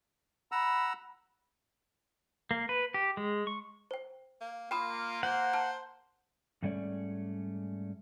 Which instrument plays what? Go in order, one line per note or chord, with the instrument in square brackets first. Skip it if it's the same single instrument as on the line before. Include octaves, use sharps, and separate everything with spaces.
[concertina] F#5 A#5 E6 [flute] B5
[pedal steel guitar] A#3
B4
G4
G#3
C#6
[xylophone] C5 G5
[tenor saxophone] A#3
[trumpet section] A#3 [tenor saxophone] F4 [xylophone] G5 B5 D#6
[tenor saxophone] C5 [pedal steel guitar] F#5
[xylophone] A5 F6 G6
[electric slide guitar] G#2 G3 A3 C#4 C#5 D5